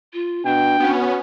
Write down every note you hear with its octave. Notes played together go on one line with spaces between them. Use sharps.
F4
B2 D4 G5
B3 C#4 F#4